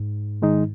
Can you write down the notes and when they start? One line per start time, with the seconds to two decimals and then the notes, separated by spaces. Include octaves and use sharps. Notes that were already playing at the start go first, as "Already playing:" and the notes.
Already playing: G#2
0.42 D#3 G#3 D#4